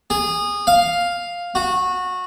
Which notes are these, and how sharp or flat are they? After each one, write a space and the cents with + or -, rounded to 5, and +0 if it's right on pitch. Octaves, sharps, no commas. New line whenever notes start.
G#4 -20
F5 +5
F#4 -20